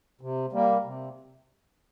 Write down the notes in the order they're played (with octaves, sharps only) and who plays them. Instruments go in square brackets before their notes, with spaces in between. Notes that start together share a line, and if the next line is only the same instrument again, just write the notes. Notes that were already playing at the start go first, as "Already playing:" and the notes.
[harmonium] C3
G3 A#3
C3